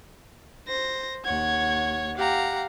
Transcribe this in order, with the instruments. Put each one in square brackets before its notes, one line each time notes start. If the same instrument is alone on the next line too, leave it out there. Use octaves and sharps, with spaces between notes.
[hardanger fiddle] C5 [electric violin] A#6
[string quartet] D#2 F#5 [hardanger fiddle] C#5 [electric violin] G#6
[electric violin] G4 F#5 [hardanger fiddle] F5 A#5